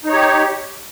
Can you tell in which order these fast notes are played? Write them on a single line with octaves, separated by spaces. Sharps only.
D#4 C#5 G4